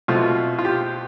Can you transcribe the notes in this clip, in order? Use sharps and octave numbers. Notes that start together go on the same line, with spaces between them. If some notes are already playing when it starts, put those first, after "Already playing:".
B2 A3 C4 F4
F4
G4